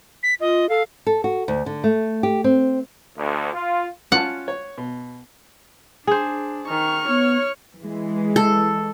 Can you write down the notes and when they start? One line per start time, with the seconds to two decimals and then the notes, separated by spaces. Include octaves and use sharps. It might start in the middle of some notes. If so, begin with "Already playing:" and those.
0.23 B6
0.40 F4 D#5
0.69 A4 F5
1.07 A4
1.24 F#4
1.48 D2
1.66 D3
1.84 A3
2.23 G4
2.44 C4
3.17 D2
3.53 F4
4.12 C#4 F4 F#5 A5
4.48 C#5
4.78 B2
6.07 D4 G#4 C5
6.68 D#3 C#6 F6
7.08 B3 C#5
7.78 E3 G#3
8.36 A4